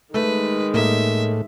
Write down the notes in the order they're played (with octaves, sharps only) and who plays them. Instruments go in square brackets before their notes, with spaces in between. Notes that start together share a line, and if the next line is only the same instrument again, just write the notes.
[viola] D#3 G#3 [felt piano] A3 [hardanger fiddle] B4
[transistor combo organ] A2 [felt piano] A#3 D#5 [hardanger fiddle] E5